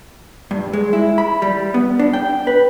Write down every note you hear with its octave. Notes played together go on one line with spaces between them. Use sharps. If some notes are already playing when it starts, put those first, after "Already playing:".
G2
G#3
E4
B5
G3
B3
D4
G5
B4